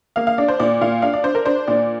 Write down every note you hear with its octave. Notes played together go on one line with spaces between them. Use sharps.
A#3 F5
F5
D4 D5
C5
A#2 D5
A#2 F5
D4 F5
D5
D4 C5
A#4
D4 C5
A#2 D5